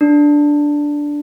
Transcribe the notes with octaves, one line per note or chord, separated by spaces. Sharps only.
D4